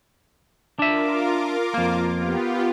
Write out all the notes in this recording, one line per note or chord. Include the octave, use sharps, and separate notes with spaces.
D4 F4 A#4 E5 D6
F2 A#3
B3 F4 G4